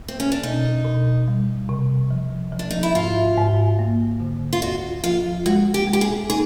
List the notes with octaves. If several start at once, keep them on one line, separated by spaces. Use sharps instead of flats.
C4
C#4
D4
B2 D#4
B2
G3
C3
F3
F3
D4
D#4
E4
G#2 F4
G#2
A#3
D3
F4
D2 F#4
F3 F4
G#3 F#4
G4
G#3
G4
G#4
D#4 G#4